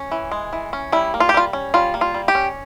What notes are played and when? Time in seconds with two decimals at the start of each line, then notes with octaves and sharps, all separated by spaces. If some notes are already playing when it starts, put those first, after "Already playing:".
Already playing: C#4
0.12 E3
0.32 G#3
0.53 E3
0.73 C#4
0.92 G3 E4
1.14 A#3
1.20 F4
1.29 G4
1.34 G3 F4
1.53 C#4
1.74 G3 F4
1.94 A#3
2.01 F4
2.14 G3
2.28 G4
2.35 C#4